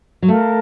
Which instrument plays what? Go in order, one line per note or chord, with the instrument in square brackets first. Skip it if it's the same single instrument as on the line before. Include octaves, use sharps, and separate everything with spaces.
[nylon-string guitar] F#3
[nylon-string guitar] A3 [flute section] A#4 F5 A5